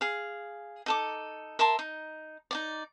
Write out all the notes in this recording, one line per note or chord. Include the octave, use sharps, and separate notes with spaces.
G#4 F5
D#4 A4 D6
A#4 E5 A5 C6
D#4
D#4 E4 D5